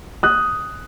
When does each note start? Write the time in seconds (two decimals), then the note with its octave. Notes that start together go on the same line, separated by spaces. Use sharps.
0.23 D#6 F#6